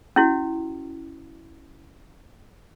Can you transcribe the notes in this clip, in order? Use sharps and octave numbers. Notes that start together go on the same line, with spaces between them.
C#4 E4 F#4